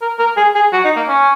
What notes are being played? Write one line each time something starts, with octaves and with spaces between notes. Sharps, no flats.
A#4
A#4
G#4
G#4
F#4
D#4
A#3
C#4